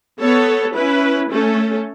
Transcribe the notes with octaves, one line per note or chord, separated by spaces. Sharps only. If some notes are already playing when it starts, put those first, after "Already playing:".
B3 A4 C#5
C#4 E4 B4
A3 C#4 A4